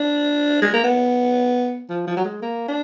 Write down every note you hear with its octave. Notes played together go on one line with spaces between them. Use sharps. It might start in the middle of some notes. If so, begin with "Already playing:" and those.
Already playing: D4
G#3
A#3
B3
F3
F3
F#3
G#3
A#3
D4